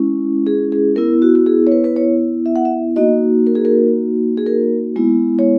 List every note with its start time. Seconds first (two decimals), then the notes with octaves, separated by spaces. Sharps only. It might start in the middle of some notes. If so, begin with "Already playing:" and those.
Already playing: G#3 C#4 E4
0.47 G#4
0.72 G#4
0.96 B3 E4 A#4
1.22 F#4
1.35 F#4
1.46 G#4
1.67 C#5
1.72 B4
1.84 B4
1.96 C#5
2.46 E5
2.56 F#5
2.65 E5
2.96 A#3 D#4 F#4 D#5
3.47 A#4
3.55 G#4
3.65 A#4
4.37 G#4
4.46 A#4
4.96 G#3 B3 E4
5.39 C#5